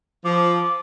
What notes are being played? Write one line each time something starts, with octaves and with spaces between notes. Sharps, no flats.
F3 D6